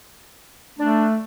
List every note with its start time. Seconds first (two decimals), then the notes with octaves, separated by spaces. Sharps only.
0.79 A3 D4